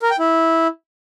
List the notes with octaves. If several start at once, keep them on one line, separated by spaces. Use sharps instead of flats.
A#4
G5
E4